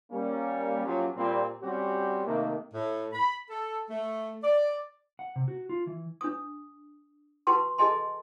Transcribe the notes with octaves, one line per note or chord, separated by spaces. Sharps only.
G3 A#3 C#4
F3 F#3 A#3 C#4 F4 G4
A#2 G3 C4
G3 C4 C#4 F#4 G4
C3 D#3 A3 A#3
A2
B5
A4
A3
D5
F#5
C3
F#4
F4
E3
D4 D#6
F#4 B4 G5 A5 C6 C#6
G#4 A4 D#5 G#5 A5 C6